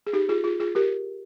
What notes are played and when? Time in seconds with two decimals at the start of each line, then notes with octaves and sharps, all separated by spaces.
0.07 G#4
0.13 D#4 G4
0.29 F4 G#4
0.44 F4 G#4
0.60 F4 G#4
0.75 G4 A#4